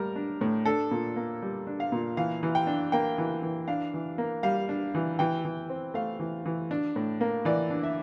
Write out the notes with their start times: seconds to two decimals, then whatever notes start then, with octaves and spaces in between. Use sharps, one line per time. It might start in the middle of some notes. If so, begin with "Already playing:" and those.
Already playing: A2 G3 A#3 A#4
0.16 D4
0.41 A2
0.65 D4 A4
0.91 A#2
1.16 A#3
1.42 G3
1.67 D4
1.80 F5
1.92 A#2
2.17 E3 F5
2.43 E3
2.55 G5
2.67 D4
2.92 A#3 G5
3.18 E3
3.43 E3
3.68 D4 F5
3.94 E3
4.18 A#3
4.43 G3 F5
4.69 D4
4.95 E3
5.19 E3 G5
5.45 E3
5.69 C4
5.94 A3 F5
6.20 E3
6.46 E3
6.71 D4
6.96 A2
7.21 A#3
7.45 E3 D5
7.70 D4
7.83 E5